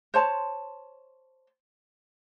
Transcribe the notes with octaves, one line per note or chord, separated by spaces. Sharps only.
C5 C#5 A5